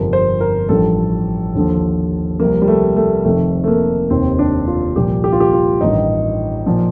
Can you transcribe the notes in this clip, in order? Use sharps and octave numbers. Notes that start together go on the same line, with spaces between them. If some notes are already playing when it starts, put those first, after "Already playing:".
Already playing: G1 F2 C3 F3 A#4
C5
A#4
A1 G2 F3 A4
D#2 D3 F3
C2 C3 F3 A#3
G3
A3
A3
F1 F2 D#3 A3
A3
A#3
F1 D#2 D#3 C4
D4
F4
C2 A#2 F3 G4
G4
F4
G4
F4
A1 G2 D#3 D#4
A#2 F3